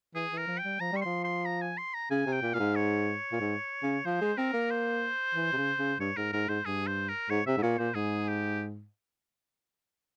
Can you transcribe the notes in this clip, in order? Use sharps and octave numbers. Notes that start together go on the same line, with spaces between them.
E3 G#4
E3
A#4
F3
G5
G3
F3 A#5
G3 C#6
F3 C6
C6
A#5
G#5
C6
A#5
C#3 G#5
C3
G5
A#2
A#2 F5
G#2
C#5
A#2
G#2
C#3
F3 C5
G#3
C4 A#4
A#3
C5
E3
C3
C#3
C#3
G2 C#5
G#2 A#4
G#2 A#4
G#2 C5
G2 G#4
C5
A#4
G#2 C#5
C3 E5
G#2
A#2 C#5
A#2 C5
G#2 G#4
G4